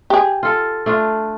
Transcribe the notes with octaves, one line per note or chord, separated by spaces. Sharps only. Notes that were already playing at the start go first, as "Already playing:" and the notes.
G4 G#4
F4 A4
A3 D4 F4